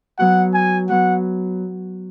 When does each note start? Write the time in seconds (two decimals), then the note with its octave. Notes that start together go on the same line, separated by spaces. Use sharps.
0.19 F#3 B3 F#4 F#5
0.54 G#5
0.89 F#3 B3 F#4 F#5